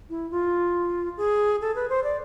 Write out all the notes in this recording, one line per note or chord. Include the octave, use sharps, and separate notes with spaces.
E4
F4
G#4
A4
B4
C5
D5